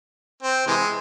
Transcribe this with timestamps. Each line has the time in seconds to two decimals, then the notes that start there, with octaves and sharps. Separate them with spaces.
0.43 C4
0.67 C3 E3 G#3